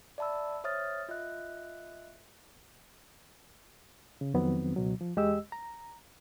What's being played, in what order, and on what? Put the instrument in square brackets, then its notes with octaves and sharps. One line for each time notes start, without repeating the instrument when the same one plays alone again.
[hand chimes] D5 E5 A5 B5 E6
C5 C#5 E5 D#6 F6 A6
F4 D#5 E5 F#6
[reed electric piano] C#3
F2 D#3 F#3 B3 C4
C#2 B2 F#3
F3
E2 G#3 G4 D#5 E6
A#5